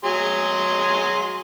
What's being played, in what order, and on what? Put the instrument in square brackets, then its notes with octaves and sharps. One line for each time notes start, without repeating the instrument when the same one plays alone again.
[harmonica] F#3 G#4 C6